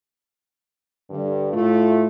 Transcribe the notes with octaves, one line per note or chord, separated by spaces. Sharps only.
G2 D3
A2 A3 F4